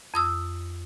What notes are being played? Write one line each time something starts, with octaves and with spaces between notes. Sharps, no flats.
F2 D#6 E6